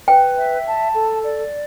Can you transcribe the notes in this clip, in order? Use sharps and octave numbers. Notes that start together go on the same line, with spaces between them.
B4 G5
E5
A5
A4
D5